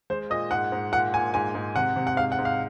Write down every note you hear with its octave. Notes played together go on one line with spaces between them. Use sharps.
G#3 C5
A#2 D#5
G#2 F#5
G#2
A#2 F#5
A#2 G#5
G#2 G#5
G#2
C3 F#5
C3
F#5
G#2 F5
F#5
G#2
F5